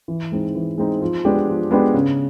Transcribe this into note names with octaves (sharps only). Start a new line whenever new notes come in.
E3
G#3 C4 D#4
E3
G#3 C4 D#4
F3
G#3 B3 D4 G4
F3
G#3 B3 D4 G4
C#3